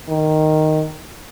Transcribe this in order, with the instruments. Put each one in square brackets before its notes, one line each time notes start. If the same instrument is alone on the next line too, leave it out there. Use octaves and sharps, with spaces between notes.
[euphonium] D#3